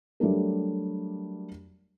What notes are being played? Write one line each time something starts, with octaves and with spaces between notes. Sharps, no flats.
F#3 G3 A3 D4 A#4